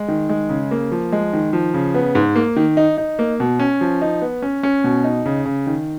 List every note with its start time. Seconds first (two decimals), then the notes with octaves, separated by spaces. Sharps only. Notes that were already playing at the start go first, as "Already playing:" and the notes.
Already playing: G#3
0.08 D#3
0.30 G#3
0.49 C#3
0.71 A#3
0.92 F3
1.12 G#3
1.33 D#3
1.53 F3
1.74 C#3
1.94 B3
2.15 G#2
2.35 A#3
2.56 D#3
2.77 D#4
2.97 D#4
3.19 A#3
3.40 B2
3.59 C#4
3.81 F3
4.02 D#4
4.21 B3
4.42 C#4
4.63 C#4
4.84 B2
5.04 D#4
5.26 C#3
5.46 C#3
5.67 D#3